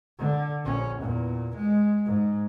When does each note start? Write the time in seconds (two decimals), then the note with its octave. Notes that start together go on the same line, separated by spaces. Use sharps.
0.18 D3
0.64 A#1 C#4
1.02 E2 A#2
1.57 G#3
2.06 G#2